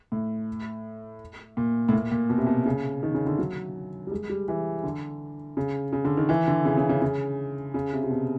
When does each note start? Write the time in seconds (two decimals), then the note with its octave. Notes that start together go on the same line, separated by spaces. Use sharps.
0.12 A2
1.57 A#2
1.89 A2
1.93 A#2
2.12 A#2
2.30 B2
2.38 C3
2.47 B2
2.66 C#3
3.03 D#3
3.15 C#3
3.27 D3
3.38 F#3
4.07 G3
4.11 G#3
4.29 G3
4.48 E3
4.84 D3
5.57 C#3
5.93 C#3
6.05 D3
6.17 D#3
6.29 E3
6.48 D3
6.65 C#3
6.77 C#3
6.89 C#3
7.02 C#3
7.74 C#3
7.93 C3
8.03 C3
8.10 B2